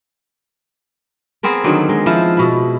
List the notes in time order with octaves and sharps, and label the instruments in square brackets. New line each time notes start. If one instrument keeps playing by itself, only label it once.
[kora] B3 C4 G#4 A#4
D3 D#3 F#3
G#3
F3 E4 F5
B2 E4